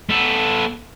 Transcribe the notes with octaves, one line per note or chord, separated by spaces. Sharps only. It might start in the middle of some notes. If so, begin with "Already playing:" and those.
B3 A4